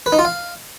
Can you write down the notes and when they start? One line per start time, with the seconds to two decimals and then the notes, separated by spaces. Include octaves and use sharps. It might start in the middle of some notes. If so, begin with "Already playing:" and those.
0.06 B4
0.12 D#4
0.19 F4
0.25 F5